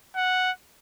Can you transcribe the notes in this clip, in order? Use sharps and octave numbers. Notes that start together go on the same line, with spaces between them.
F#5